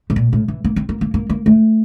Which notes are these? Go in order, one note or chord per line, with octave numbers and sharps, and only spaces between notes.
A2
A#2
A2
E3
A#3
C4
A#3
A#3
A#3
A#3
A3